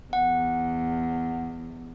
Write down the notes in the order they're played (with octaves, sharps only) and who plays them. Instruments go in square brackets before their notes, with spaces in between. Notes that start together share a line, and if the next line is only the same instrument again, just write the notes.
[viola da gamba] E2 [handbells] F#5